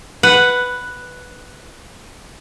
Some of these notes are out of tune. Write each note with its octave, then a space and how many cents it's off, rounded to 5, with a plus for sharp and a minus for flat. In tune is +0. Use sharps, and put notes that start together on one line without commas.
B4 +5 F#5 +0